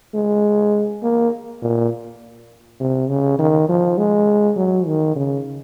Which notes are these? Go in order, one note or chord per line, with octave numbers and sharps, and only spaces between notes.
G#3
A#3
A#2
C3
C#3
D#3
F3
G#3
F#3
D#3
C#3